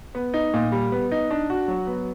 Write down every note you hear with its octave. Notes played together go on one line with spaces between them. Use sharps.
B3
D#4
A#2
G3
B3
D#4
D4
F#4
F#3
B3